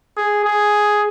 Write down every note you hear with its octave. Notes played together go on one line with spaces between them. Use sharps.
G#4
G#4